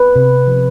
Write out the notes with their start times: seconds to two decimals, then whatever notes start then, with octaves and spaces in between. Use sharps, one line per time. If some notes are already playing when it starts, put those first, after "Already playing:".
Already playing: B4
0.16 C3
0.47 F3